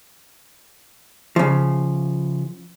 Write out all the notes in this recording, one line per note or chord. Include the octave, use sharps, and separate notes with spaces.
C#3 F3